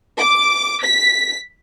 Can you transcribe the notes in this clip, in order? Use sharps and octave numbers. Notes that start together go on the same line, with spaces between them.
D6
B6